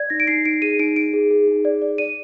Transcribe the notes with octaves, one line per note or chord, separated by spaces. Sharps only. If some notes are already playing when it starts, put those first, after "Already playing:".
Already playing: D5 G#6
D#4 A#6
D7
D#4 C7
D#4 D7
G#4 D#7
D#4 D7
D#4 D7
G#4
G#4
D#4
D5
D5
D5 D#7